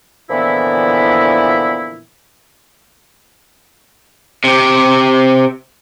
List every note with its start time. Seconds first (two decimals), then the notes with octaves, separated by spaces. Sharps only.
0.31 A#2 D3 E3 F3 B3 E4
4.44 C3 G4